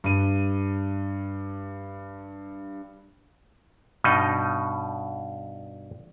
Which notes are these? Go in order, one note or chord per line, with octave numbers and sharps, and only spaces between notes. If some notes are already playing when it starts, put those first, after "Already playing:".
G2 D#7
G2 B2 D#4 D#5